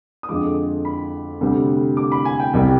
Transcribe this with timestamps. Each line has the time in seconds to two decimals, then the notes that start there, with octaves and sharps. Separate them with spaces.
0.23 D#6
0.29 F2 D3 F3 G#3 D6
0.85 B5
1.41 D2 C3 G3
1.97 D6
2.12 B5
2.25 G#5
2.40 G5
2.53 C2 C3 G3 G5